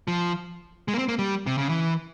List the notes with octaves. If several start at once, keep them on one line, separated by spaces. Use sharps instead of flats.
F3
G#3
A#3
C4
A#3
G3
C3
C#3
E3